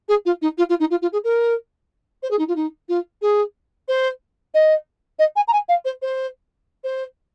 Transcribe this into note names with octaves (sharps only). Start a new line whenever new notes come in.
G#4
F4
D#4
F4
F4
D#4
F4
F4
G#4
A#4
C5
G#4
D#4
F4
D#4
F4
G#4
C5
D#5
D#5
G#5
A#5
G#5
F5
C5
C5
C5